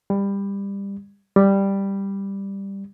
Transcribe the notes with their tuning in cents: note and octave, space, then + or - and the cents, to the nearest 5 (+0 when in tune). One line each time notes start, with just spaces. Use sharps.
G3 +20
G3 +5